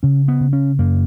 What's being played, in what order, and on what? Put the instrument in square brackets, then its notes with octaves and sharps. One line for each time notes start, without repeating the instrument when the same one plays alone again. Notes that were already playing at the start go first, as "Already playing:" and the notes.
[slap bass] C#3 C#4
B3
C#3
C#4
F#2 A#3